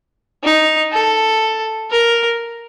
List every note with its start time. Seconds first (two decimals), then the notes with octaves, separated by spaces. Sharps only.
0.44 D#4
0.92 A4
1.91 A#4